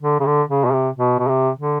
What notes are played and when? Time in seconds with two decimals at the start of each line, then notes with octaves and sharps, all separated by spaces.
0.02 D3
0.20 C#3
0.26 D3
0.49 C#3
0.65 B2
0.73 C3
0.96 B2
1.19 B2
1.28 C3
1.59 D3